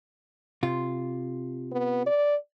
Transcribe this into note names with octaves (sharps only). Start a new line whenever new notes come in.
C3 F4
B3
D5